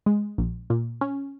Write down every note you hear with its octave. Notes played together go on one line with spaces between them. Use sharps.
G#3
A#1
A#2
C#4